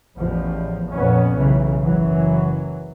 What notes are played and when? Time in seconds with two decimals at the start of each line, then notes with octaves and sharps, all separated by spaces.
0.16 A1 E2 A2 F3
0.91 F2 A#2 B3 C#4
1.35 B1 C#3 E3
1.83 F#1 E3 F#3